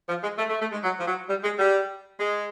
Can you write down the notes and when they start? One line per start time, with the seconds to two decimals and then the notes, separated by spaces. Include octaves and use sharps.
0.08 F3
0.23 G#3
0.38 A3
0.50 A3
0.61 A3
0.72 G#3
0.84 F#3
0.99 F3
1.07 F#3
1.29 G3
1.43 G#3
1.59 G3
2.19 G#3